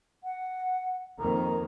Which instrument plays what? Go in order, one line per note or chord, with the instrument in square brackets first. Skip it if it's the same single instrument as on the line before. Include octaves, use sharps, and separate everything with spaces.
[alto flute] F#5
[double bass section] F2 D#3 A#3 [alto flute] A#5